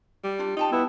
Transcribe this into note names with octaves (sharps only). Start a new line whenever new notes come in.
G3
D4 F4 D5
D#4 F4 G5 A5
B3 E4